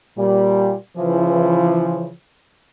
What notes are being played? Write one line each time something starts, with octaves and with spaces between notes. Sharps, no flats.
A#2 G3
C#3 E3 F3